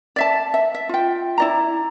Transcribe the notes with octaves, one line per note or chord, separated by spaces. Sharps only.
D5 E5 A5
E5
E5
F4 G5
E4 D5 A#5